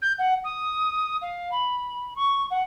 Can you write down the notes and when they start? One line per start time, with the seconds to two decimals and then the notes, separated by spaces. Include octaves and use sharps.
0.02 G6
0.18 F#5
0.44 D#6
1.21 F5
1.51 B5
2.16 C#6
2.50 F#5